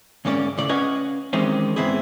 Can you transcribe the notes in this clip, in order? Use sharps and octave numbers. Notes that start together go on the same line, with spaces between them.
D2 G#2 A#3 C#4 D5
A2 C#3 D5
C#4 B4 D#5 F5 F#5 G#5
D#2 D#3 E3 G#3 C4 C#4
G#2 B2 B3 C4 E4 G#4